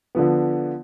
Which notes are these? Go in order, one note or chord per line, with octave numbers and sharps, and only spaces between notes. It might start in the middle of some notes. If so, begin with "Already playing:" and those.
D3 F3 B3